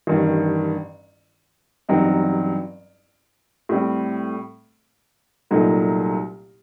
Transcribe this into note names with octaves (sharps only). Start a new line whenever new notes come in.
A1 G2 D#3
A1 G2 F#3 C4 D#4
A2 G3 C4
C2 A#2 F#3 A3 D#4